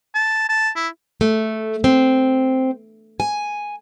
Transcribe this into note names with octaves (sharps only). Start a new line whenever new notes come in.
A5
A5
E4
A3
C4
G#5